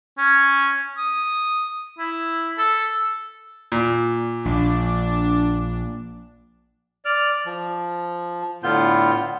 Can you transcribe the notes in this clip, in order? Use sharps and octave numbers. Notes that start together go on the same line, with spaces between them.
C#4
D#6
E4
A4
A#2
A#1 D4
D5 F6
F3
A2 D3 B3 F4 G6